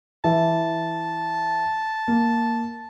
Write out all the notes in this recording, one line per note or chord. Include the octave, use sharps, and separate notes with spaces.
E3 A5
A#3